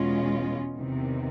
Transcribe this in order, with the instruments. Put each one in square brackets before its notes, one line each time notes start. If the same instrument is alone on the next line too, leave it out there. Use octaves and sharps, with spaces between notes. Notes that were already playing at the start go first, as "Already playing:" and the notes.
Already playing: [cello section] E2 B2 G#3 C#4 F4
E2 C3 D#3